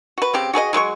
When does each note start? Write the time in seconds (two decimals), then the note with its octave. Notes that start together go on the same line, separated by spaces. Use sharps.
0.18 F#4 B4
0.34 C#3 C4 G4
0.53 F#4 G#4 B4 D#5
0.73 F#3 G#3 C5 C#6